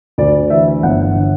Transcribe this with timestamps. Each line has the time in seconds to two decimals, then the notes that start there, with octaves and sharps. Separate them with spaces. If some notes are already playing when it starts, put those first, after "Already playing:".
0.18 D2 D5
0.50 E3 E5
0.83 G1 F#5
1.15 D3